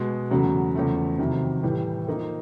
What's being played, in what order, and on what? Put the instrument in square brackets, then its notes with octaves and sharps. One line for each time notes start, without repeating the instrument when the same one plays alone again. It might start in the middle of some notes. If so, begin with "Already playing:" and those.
Already playing: [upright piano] B2 G#3 B3
E2 C#3 F#3 A3
E2 C#3 F3 A3
F2 C3 D#3 F#3
A2 E3 G3
F3 A#3 D#4